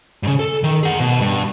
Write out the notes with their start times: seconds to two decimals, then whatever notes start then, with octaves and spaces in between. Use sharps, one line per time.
0.23 G2 C#3
0.39 A4
0.63 D#3
0.83 G#4 F#5
1.00 B2
1.21 G2